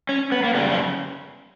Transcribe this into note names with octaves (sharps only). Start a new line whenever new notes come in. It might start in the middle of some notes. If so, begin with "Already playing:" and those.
C#4
B3
A#3
F#2 C#3 G3 B3
C#4